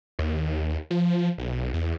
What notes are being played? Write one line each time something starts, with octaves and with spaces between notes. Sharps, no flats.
D#2
F3
B1
E2